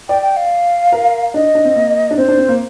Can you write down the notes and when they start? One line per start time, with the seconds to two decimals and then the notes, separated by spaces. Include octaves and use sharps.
0.09 D5 G5
0.22 G5
0.37 F5
0.92 A#4
1.34 D4 D#5
1.55 D4
1.65 C4
1.76 A#3
2.11 D4
2.17 C4 C5
2.28 D4
2.38 C4
2.48 A#3